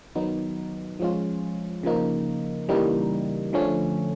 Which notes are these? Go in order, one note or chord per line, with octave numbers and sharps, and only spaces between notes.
D#3 F#3 B3 D#4
F3 G#3 C#4 F4
C#3 F3 A#3 D#4
C#3 E3 G3 A#3 D#4
D3 F3 A3 C#4